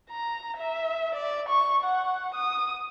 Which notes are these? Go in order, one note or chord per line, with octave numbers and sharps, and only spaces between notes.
A#5
E5
D5
C#6
F#5
D#6